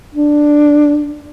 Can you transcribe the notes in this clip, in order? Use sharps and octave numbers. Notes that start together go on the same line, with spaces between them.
D4